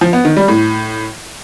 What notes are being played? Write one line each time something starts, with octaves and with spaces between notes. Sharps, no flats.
F3
B3
D#3
G3
A2